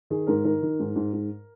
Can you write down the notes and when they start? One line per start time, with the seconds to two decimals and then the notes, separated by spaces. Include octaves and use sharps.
0.10 D#3 G#4
0.27 G#2 A#4
0.44 D#3 A#4
0.62 D#3
0.80 G#2
0.96 G#2
1.13 G#2